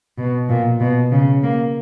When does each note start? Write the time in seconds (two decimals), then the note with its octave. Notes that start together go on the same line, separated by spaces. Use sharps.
0.18 B2
0.49 A#2
0.80 B2
1.12 C#3
1.43 A#3